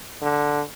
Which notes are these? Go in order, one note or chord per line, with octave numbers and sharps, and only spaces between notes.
D3